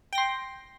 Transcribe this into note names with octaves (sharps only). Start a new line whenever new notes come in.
G5 C6 A#6